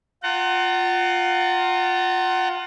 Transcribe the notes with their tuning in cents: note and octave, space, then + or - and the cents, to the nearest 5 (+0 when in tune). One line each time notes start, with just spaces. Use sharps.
F4 +15 F#5 +30 A#5 -35